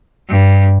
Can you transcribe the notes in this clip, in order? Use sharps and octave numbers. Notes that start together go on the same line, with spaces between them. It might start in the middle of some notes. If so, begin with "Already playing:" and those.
G2